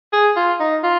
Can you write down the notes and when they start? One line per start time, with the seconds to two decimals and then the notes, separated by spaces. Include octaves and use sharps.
0.13 G#4
0.36 F4
0.60 D#4
0.84 F4